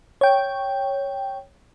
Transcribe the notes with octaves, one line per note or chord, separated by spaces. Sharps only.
C#5 G5